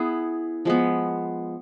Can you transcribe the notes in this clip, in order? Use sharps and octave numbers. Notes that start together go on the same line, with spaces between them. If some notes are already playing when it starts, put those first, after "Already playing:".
Already playing: B3 E4 G#4
F3 G#3 B3